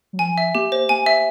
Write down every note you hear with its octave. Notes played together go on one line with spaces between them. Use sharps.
F#3
F3 G#5
E5
A#3 G4
C5
A#3 G#5
E5